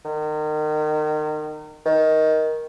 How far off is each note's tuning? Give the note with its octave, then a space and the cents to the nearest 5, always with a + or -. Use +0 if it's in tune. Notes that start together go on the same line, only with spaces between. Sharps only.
D#3 -30
D#3 +10